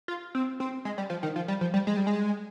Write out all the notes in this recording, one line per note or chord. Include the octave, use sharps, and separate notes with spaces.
F4
C4
C4
G#3
G3
F3
D#3
F3
G3
F3
G3
G#3
G3
G#3